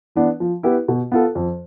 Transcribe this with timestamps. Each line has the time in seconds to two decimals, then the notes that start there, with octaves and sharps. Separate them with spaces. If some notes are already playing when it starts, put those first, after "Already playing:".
0.15 E3 B3 D4
0.40 F3
0.63 B3 E4 G4 B4
0.88 B2
1.12 B3 F4 A4
1.35 F2